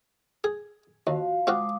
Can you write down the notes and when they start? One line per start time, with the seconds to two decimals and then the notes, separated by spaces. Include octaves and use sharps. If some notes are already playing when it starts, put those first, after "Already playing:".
0.44 G#4
1.07 D#2 F3 F#4 F5
1.47 G#3 C4 F4 F#4 D6 D#6